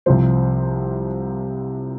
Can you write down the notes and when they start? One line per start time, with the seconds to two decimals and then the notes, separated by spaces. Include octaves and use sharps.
0.06 C2 C3 F3 C5